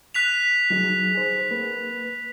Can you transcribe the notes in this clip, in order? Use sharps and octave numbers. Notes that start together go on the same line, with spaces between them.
F#6 B6 F7
F#3 D#4 G#4
G#4 C5
A#3 B4